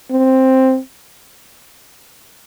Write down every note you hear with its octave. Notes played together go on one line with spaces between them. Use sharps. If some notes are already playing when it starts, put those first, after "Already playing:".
C4